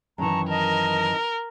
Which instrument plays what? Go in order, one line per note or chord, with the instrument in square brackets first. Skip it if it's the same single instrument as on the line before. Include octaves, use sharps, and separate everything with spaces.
[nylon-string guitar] F#2 D#3 E3 [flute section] A5 A#5 C#6
[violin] A#4 [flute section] D#5 A5